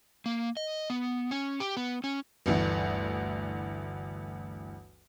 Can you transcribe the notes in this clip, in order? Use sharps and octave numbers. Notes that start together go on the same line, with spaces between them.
A#3
D#5
B3
C#4
G4
B3
C#4
G1 D2 E3